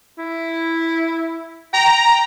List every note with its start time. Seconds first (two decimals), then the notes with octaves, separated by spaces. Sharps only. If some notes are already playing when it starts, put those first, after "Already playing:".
0.18 E4
1.73 G5 A#5